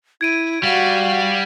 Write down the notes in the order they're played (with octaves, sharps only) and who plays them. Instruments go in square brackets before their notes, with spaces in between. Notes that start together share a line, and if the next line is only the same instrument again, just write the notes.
[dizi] E4 [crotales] G#6 D7 D#7
[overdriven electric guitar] G3 [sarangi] F#4 [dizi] F5